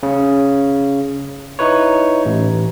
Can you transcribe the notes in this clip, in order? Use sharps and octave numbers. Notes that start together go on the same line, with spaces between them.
C#3
D#4 E4 B4 C#5
A1